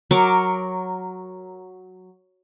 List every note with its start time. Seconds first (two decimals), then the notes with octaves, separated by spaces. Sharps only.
0.11 F#3 A#4 C#6 D6